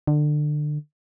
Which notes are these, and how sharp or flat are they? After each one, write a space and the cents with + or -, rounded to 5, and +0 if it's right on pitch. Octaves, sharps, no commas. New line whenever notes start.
D3 +25